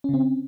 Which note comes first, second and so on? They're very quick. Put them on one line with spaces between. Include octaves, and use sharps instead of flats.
C#4 C#3 C4